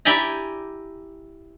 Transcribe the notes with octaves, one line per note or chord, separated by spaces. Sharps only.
E4 G4 D5 G5 G#5 A#5